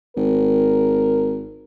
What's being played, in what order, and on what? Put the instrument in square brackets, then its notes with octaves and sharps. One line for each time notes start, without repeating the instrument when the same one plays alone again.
[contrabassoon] G#1 [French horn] A#4